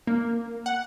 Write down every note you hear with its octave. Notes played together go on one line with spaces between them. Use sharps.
A#3
F#5